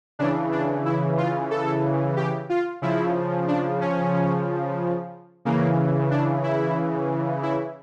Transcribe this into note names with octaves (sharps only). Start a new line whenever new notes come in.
C#3 E3 D4
D4
E4
F4
A4
G4
F4
C#3 F3 E4
D4
C#4
C#3 E3 A#3
D4
E4
E4